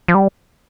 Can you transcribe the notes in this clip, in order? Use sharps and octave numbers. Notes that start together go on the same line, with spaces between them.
F3
G3